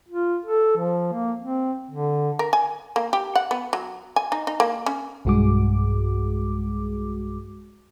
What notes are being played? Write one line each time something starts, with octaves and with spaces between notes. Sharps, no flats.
F4
A4
F3
A#3
C4
D3
A#4
G#5
A#3
G4
F#5
B3
F#3
G#5
D#4
D#4
A#3
C#4
B1 G2 G#3 F#4 G#4 D6